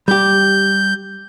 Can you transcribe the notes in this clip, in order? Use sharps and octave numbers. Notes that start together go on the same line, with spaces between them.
G3 G4 G6